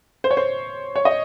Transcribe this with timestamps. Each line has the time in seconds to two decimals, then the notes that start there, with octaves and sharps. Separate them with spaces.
0.24 C5
0.31 C#5
0.37 C5
0.96 C#5
1.05 D#5